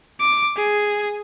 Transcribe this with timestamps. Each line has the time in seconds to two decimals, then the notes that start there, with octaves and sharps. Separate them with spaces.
0.21 D6
0.57 G#4